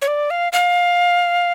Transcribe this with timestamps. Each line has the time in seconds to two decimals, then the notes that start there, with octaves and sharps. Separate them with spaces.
0.02 C#5
0.08 D5
0.30 F5
0.53 F5